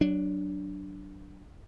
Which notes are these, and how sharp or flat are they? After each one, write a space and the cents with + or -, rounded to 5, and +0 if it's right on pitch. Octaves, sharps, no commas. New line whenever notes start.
F#3 +15 D4 +0